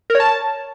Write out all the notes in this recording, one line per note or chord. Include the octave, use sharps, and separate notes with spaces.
A#4
C#5
A5